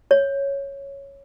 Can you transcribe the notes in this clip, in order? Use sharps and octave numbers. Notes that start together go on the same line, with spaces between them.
C#5